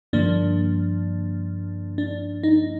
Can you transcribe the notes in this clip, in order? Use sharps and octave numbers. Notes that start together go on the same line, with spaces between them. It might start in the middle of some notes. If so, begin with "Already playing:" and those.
G2 D3 F3 A#3 D4
D4
D#4